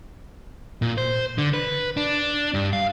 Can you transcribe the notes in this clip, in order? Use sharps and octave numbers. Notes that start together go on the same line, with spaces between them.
A#2
C5
D3
B4
D4
G2
F5